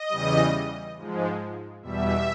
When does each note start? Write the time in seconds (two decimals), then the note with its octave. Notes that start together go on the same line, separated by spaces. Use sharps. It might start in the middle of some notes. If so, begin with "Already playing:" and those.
Already playing: D#5
0.09 E2 C#3 E3 G3
0.96 G#2 F3 G#3
1.83 E2 B2 G3 E5